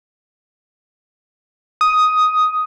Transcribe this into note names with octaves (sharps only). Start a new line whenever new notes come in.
D#6